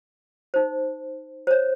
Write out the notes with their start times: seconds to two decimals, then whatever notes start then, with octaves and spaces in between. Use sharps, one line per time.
0.54 D#4 C5
1.47 C5 C#5